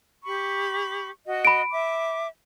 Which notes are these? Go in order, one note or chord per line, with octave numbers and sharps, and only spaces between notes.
G4 B5 C#6
F#4 D#5
B5 D7
E5 D6